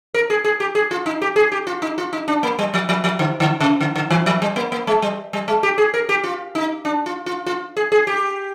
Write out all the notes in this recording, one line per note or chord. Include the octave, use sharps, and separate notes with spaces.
A#4
G#4
G#4
G4
G#4
F4
D#4
G4
G#4
G4
F4
D#4
F4
D#4
D4
A#3
G3
F3
F3
F3
D3
D3
C3
D3
D3
D#3
F3
G3
A#3
A#3
G#3
G3
G3
G#3
G4
G#4
A#4
G4
F4
D#4
D4
F4
F4
F4
G#4
G#4
G4